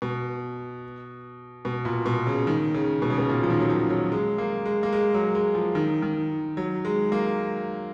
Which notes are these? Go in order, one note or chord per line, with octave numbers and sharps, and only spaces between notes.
B2
B2
A#2
B2
C#3
D#3
C#3
B2
C#3
B2
A#2
F3
D#3
F#3
F3
F#3
G#3
A#3
G#3
A#3
G#3
F#3
G#3
F3
D#3
D#3
F#3
G#3
A#3